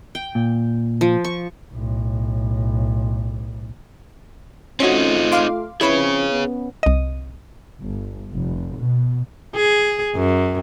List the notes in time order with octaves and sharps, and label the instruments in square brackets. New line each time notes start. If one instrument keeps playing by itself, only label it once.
[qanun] G5
[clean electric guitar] A#2
[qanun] F3
C#6
[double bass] B1 A2
[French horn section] A3 F4 [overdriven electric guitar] C4 D#4 [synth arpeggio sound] C#4 F#4
[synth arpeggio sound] F5 C6 D6
[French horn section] F3 C4 C#4 [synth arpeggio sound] E4 B4 [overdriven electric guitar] G#4 C#5
[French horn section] B3 C#4
[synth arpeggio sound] C2 D#5
[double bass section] G1
F1
B2
[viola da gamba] G#4
F#2